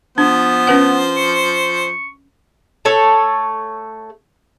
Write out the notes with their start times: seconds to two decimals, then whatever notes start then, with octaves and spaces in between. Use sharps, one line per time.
0.18 F3 B3 D4 C5
0.67 C#4 B4 F#5
1.17 C#6
2.85 A3 A4 C#5